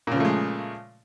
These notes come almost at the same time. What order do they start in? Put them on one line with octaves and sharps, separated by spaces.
A#2 C#3 F3 A3 G#3